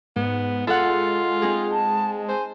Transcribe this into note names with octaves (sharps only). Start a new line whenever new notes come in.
G#2 B3
G#3 F4 A4 F#5
C4 D#4 G#4
A5
C5 G#5